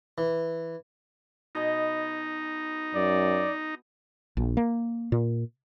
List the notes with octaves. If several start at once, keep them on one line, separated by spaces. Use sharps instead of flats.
E3
B2 D#4 D#5
F#2 D5
A#1
A#3
A#2